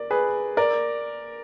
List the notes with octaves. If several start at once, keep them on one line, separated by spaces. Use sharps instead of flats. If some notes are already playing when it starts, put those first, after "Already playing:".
Already playing: A#4 D5
G#4 B4
A#4 D5